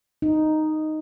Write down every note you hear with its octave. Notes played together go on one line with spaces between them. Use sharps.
D#4